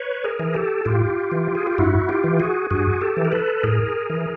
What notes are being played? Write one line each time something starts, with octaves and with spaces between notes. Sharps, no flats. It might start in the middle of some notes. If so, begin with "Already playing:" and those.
Already playing: B4 C#5
G#4 A#4
E3
G4 A4
A2 F4 G4
E3
G#4
G4
G2 E4 F#4
F4 G4
E3
F#4 G#4
G2 F#4 G#4
G4 A4
E3
A#4
A4 B4
A2 G#4 A#4
E3